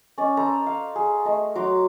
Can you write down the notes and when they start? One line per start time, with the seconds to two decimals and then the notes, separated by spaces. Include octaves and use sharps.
0.18 C#4 D5 D#5
0.37 A4 C5 A#5
0.66 F5
0.95 G#4
1.25 A3 D#5
1.55 F#3 A#5 C6 D6